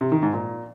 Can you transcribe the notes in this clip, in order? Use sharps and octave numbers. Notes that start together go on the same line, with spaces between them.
C3
D#3
G#2
A#2